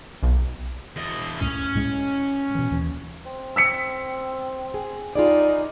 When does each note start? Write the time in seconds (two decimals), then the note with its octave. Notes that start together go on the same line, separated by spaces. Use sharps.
0.23 B1
0.96 E2 D#5
1.41 C#2 F#2 A2 C#4
1.75 A2 G#3
2.55 B2 E3
2.71 D#2 E3
3.26 C4
3.56 E6 B6 C#7
4.74 G#4
5.15 G3 D#4 F4 G#4 D5